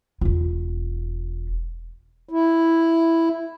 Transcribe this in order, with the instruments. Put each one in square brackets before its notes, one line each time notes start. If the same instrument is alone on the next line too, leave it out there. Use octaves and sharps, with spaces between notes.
[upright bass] E1 F4
[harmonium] E4